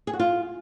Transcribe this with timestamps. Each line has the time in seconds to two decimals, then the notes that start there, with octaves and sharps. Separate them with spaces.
0.07 G#4
0.13 F#4
0.19 F4